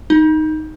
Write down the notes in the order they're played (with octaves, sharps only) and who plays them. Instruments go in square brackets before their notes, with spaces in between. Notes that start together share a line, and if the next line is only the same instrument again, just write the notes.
[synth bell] D#4